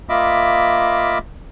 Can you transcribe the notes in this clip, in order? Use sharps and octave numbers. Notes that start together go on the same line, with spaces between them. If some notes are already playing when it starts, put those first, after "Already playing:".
A#3 F4 D#5 E5 B5 D6